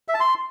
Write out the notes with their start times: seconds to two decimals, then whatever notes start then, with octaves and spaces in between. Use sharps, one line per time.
0.08 E5
0.14 A5
0.20 C6